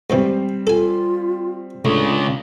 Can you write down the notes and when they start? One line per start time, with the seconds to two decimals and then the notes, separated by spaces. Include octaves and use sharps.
0.10 G#2 C#3 E3 G3 C4 C5
0.67 F4 A4 G#5
1.85 A2 C#3 G#3 D4